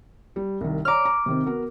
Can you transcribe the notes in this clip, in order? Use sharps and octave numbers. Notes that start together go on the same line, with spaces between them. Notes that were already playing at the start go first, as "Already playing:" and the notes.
G3
C2 D#3
C#5 D5 A#5 D6 F6
A#5
C3 D#3 C4
B3 F#4 A#4